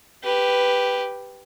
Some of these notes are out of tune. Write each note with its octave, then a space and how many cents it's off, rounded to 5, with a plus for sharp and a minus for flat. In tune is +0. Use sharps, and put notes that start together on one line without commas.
G4 +0 B4 +0